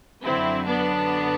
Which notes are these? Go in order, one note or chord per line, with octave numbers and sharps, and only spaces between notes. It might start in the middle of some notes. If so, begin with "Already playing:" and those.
F#2 D3 F#3 C4 E4
B3 D4